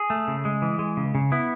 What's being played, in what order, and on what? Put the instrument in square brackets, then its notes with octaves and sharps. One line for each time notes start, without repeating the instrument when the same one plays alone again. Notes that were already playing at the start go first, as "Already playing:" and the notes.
Already playing: [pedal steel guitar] G#4
A3
C#3
G#3
E3
G#3
C#3
C#3
B3 E4